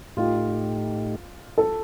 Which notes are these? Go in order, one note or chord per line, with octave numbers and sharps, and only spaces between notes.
A2 A3 D#4 F4 G4
A4